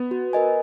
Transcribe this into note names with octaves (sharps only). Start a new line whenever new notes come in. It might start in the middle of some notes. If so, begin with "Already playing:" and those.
Already playing: B3
F#4
A#4 D#5 G#5